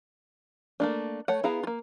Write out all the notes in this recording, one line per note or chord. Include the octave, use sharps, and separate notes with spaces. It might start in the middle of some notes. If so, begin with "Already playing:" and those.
A3 A#3 D4
A3 C#5 F#5
B3 E4 G#4 F5 A#5
A#3 F4